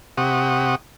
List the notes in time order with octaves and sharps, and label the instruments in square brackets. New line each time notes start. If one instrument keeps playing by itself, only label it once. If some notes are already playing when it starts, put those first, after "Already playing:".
[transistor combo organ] C3 G4 F#5 C#6 D#6